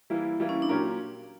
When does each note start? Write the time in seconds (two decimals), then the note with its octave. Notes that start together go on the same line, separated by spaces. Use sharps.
0.10 E3 G3 A#3 E4
0.40 E3 G3 A#3 E4
0.49 C#4
0.62 D4
0.69 A#2 F#3 C#4 G4 A#4